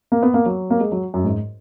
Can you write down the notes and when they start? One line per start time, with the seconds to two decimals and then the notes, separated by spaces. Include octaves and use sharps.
0.12 A#3
0.23 B3
0.34 A#3
0.46 F#3
0.70 A#3
0.80 G#3
0.92 F#3
1.14 F#2
1.25 G#2